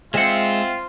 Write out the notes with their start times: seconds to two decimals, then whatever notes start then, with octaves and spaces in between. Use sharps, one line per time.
0.14 G#3 C4 F4 E5 F#5